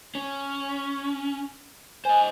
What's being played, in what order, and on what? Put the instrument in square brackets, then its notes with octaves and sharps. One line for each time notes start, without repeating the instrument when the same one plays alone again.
[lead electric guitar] C#4
[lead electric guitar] C5 D#5 [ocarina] G#5